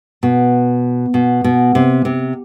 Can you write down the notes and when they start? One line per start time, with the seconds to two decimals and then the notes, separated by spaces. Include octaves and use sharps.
0.23 B2
1.14 B2
1.44 B2
1.75 C3
2.05 C3